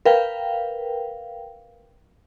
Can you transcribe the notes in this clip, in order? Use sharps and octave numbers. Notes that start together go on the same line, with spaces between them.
A#4 B4 F5 G5